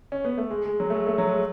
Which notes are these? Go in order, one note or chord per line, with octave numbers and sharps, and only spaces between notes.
C#4
B3
A3
G#3
G#3
F#3
A3
G#3
A3
F#3
G#3